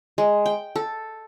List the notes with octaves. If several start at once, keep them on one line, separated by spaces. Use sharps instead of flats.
G#3
G5
A4